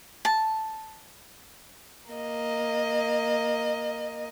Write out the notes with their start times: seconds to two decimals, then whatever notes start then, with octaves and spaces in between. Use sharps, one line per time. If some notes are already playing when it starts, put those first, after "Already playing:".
0.25 A5
2.11 A#3 D#5